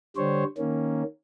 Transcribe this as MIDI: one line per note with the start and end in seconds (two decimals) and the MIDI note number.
0.17 0.44 50
0.17 0.44 55
0.17 0.44 72
0.17 0.44 73
0.58 1.03 51
0.58 1.03 58
0.58 1.03 61